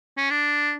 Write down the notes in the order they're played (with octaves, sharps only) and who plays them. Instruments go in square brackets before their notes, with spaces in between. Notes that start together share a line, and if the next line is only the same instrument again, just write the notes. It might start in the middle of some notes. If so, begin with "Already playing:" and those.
[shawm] C#4
D4